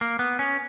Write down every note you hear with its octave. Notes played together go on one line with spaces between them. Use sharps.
A#3
B3
C#4